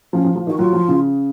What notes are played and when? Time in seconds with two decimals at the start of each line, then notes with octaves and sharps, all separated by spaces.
0.13 F3 C#4
0.24 F3
0.36 F3
0.47 D#3 F#4
0.58 F#3 F4
0.73 F3
0.88 C#3